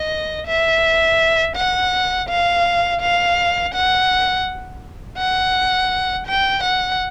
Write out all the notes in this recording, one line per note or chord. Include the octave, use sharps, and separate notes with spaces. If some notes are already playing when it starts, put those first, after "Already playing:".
Already playing: D#5
E5
F#5
F5
F5
F#5
F#5
G5
F#5